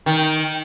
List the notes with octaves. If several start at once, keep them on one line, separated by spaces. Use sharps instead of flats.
D#3